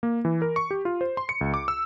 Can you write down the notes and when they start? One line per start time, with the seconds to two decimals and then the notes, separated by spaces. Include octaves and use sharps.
0.03 A#3
0.25 E3
0.42 A#4
0.56 C#6
0.71 G4
0.85 F4
1.01 C5
1.17 C6
1.29 C#7
1.41 C#2
1.54 D6
1.68 E6